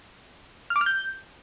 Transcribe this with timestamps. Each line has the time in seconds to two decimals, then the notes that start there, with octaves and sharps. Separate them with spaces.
0.70 F6
0.76 D6
0.81 F6
0.86 G6